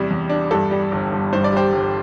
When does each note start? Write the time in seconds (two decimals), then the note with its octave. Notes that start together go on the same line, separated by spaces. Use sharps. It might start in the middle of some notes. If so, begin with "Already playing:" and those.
Already playing: E2 C3 G3
0.10 E2
0.30 D4
0.51 G2 A4
0.71 G3
0.91 G1
1.12 G1
1.33 G2 C5
1.44 D5
1.52 G3 G4 C5
1.73 G1